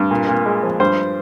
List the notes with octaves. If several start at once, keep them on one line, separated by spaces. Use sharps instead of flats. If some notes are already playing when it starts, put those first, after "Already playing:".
Already playing: G2
A#2
A#2
G#3
F3
G2 C5